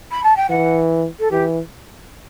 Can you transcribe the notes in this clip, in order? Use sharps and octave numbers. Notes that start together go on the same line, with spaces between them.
B5
A5
G5
E3 F#5
A4
E3 G4